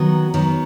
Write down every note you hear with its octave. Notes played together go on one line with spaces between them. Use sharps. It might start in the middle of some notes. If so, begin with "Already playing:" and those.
Already playing: D#3 F#3 B3
D#3 F#3 B3